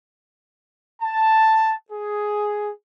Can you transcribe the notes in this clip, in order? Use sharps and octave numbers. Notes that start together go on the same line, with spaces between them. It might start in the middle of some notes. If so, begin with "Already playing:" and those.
A5
G#4